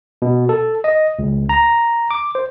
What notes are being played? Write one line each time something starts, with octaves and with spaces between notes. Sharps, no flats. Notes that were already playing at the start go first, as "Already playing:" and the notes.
B2
A4
D#5
C#2
A#5
D6
C5